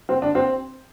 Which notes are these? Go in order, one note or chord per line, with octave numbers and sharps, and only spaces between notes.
C4
D4
C4